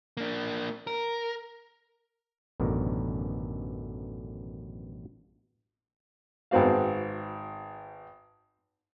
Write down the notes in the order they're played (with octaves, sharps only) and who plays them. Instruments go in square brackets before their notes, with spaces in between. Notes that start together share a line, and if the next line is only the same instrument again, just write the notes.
[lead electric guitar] A#3 D4
A#4
[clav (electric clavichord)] A1 F#2 B2 D3 D#3 A#4
[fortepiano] G#1 B3 C4 F#4 F5